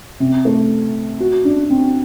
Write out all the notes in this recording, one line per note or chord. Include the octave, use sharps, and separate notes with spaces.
C3
A3
F#4
D4
C4